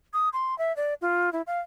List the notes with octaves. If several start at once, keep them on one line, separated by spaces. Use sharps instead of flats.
D#6
C6
E5
D5
F4
E4
F5